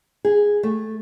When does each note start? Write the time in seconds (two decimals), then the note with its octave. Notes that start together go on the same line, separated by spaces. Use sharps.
0.25 G#4
0.63 A3